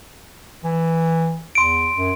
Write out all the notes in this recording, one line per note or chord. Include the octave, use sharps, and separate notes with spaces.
E3
E2 C6 D7
F#2